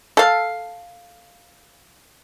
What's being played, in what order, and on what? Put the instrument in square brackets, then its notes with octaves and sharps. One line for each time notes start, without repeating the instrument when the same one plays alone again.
[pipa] A4 F5